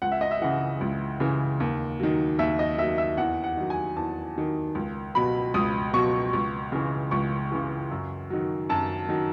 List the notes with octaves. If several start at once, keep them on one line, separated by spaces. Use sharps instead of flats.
C#2 F#5
E5
D#5
E5
C#3 E3 F#5
C#2
C#3 E3
D#2
D#3 F#3
D#2 E5
D#5
D#3 F#3 E5
E5
E2 F#5
F#5
D#3 F#3
G#5
E2 A5
D#3 F#3
C#2
B2 F#3 B5
C#2 D#6
B2 F#3 C#6
C#2
C#3 E3
C#2 C#6
C#3 E3
F#2
D#3 F#3
F#2 A5
D#3 F#3